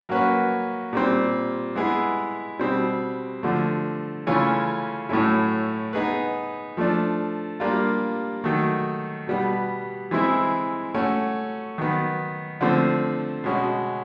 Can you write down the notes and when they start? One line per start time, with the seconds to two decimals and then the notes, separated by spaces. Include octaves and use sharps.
0.09 F#3 A#3 C#4 F#4 B4
0.93 A#2 G3 C4
1.75 G#3 B3 E4 G#4
2.59 B2 G3 C4
3.43 D3 F3 A3
4.27 C#3 E3 A3 C#4 F4
5.09 A2 F#3 A3 C#4 E4
5.93 B3 D#4 G#4 B4
6.77 F3 A3 D4
7.60 G3 A#3 D4 F4
8.44 D#3 F#3 A3
9.27 B2 G3 B3
10.11 E3 G#3 C4 E4
10.94 A3 C#4 F#4
11.78 D#3 F#3 B3
12.61 D3 F3 A3 C4
13.44 B2 G#3 C#4 F#4